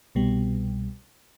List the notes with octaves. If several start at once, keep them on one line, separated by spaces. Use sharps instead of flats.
C2 B2 G3